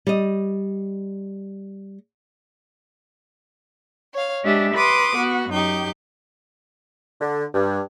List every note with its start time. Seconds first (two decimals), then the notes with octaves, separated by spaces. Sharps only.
0.07 G3 D#5
4.13 C#5 F5
4.43 G#3 D4 G4 E5
4.75 B4 C6 D6 D#6
5.17 B3 F#4
5.50 F#2 D#4 G4 G6
7.21 D3
7.54 G2